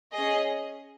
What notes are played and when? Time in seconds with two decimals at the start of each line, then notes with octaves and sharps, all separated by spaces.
0.13 C#4 G#4 D#5